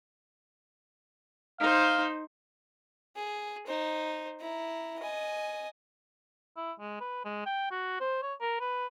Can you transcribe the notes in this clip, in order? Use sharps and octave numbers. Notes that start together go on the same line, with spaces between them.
D#4 C5 F5
G#4
D#4 C5
E4 A#5
D#5 G#5
E4
G#3
B4
G#3
G5
F#4
C5
C#5
A#4
B4